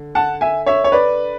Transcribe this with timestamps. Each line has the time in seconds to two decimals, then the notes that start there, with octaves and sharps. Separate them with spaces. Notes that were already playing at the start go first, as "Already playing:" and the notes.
Already playing: D3
0.15 F#5 A5
0.41 E5 G#5
0.66 C#5 E5
0.84 C#5
0.92 B4 D5